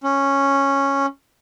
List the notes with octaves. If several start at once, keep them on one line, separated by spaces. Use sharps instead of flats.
C#4